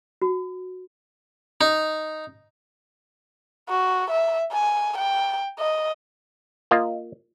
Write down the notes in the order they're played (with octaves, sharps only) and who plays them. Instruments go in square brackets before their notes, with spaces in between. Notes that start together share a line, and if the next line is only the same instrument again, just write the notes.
[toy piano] F#4
[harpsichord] D#4
[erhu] F#4
E5
G#5
G5
D#5
[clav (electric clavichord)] A#3 F4 D#5